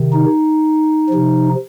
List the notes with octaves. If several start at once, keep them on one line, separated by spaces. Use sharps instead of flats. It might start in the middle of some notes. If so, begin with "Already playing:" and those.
Already playing: C3 D#3
D#4
C3 F3